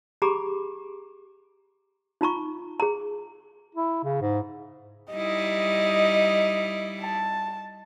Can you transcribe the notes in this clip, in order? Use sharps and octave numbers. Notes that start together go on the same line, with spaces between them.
G4 G#4 A#5 B5 D6
D#4 F4 A#5 C#6
G#4 A#5
E4
C#3
G#2
G3 D#4 E4 D#5
A5